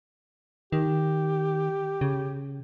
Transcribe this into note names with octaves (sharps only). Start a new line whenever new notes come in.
D#3 G4
C#3